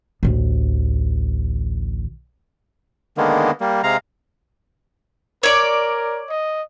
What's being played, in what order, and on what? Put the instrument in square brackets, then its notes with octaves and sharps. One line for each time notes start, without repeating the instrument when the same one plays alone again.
[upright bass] A1 D2
[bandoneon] D3 D#3 G#3 A#3 B3
G3 A#3
C3 G#3 F5 A#5
[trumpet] A#4 [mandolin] C#5 D5
[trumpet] D#5